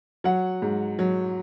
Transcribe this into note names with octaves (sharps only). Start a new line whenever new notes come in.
F#3 F#5
G#2
F#3